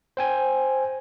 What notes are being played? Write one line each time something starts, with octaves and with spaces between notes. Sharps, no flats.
C5 G5 G#5